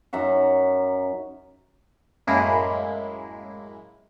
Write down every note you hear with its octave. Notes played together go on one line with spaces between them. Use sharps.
F#2 D#4 E5 F#5
F#2 A2 G#3 A#3 E4